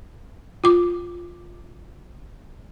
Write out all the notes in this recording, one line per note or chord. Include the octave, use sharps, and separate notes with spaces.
F4 D6